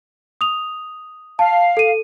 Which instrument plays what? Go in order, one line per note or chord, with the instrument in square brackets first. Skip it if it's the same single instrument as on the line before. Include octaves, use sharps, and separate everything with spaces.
[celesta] D#6 F7
[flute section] F5 [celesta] A5
[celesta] A4 D#7